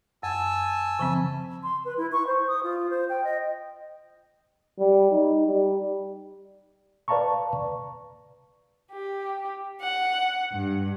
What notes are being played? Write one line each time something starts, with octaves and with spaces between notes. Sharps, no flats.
F#2 G#5 A5 E6
C#3 F3 C4
C6
B4
E4
C#6
C5
D#6
F4
C5
G5
D#5
G3
D#4
G3
B4 D5 F5 A5 A#5 C#6
G4
F#5
G2